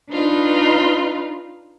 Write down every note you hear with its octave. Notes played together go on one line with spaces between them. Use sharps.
D4 D#4 F4 B4